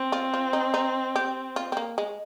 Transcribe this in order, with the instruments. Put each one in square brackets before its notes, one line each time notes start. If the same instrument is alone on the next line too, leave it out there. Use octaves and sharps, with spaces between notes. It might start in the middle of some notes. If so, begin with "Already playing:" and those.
Already playing: [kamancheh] C4
[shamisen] F4
F4
D#4
D#4
G4
F4
C4
A#3
G#3